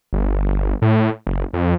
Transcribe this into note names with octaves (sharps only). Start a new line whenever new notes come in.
G1
A2
F#1
F2